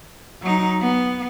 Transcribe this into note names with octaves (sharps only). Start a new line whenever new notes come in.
F#3 D#4
B3